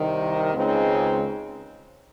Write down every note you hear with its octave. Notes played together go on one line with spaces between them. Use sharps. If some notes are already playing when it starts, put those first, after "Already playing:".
Already playing: C2 C3 D#3
C#2 C#3 G#3 C4 D#4